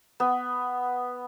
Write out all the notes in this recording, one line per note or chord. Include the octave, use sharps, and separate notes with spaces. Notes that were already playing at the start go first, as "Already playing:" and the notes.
B3